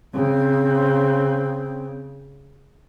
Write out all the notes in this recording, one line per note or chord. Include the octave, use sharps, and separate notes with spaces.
C#3 C4